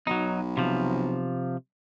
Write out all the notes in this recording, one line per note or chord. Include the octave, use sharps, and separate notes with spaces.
B1 F#3 D#4
C3 F3